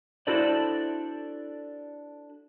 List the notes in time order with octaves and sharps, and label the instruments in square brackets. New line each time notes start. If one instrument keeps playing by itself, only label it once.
[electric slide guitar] D4 E4 F#4 A4 C5 D5